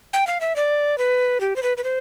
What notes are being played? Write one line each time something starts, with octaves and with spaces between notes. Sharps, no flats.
G5
F5
E5
D5
B4
G4
C5
B4
B4
C5